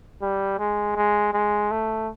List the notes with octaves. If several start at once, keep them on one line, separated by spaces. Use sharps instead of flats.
G3
G#3
G#3
G#3
A3